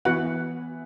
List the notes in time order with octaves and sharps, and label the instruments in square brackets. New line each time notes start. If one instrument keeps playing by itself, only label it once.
[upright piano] E3 B3 E4 B4 [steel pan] F#4 F#5